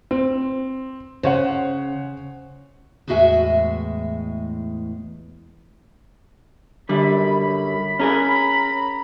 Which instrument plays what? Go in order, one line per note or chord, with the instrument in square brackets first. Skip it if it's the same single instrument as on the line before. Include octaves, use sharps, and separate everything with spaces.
[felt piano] C4
[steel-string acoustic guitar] C#3 [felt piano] C5 C#5 F#5
[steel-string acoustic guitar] E2 A2 G#3 F#4 E5 G#5
[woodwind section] F#2 B5 [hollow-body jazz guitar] D3 G3
[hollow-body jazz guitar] C#4 G#4 A#4 [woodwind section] A#5 B5